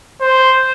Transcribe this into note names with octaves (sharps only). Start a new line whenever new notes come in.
C5